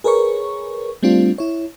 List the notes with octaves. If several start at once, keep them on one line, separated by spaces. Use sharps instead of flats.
G#4 A#4 B4 C#5 C#6
G3 A3 C4 D4 F4
E4 C#5